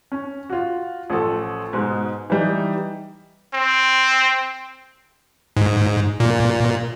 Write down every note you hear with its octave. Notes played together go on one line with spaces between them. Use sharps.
C#4
F4 F#4
A1 F3 A4
G#2 B2 G#3
E3 G3 D#4
C4
G#2
A#2